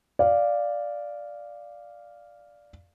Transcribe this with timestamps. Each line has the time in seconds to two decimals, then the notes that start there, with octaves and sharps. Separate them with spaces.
0.19 D5 F5